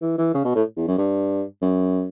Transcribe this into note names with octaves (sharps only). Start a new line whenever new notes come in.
E3
E3
C#3
B2
A2
E2
F#2
G2
F#2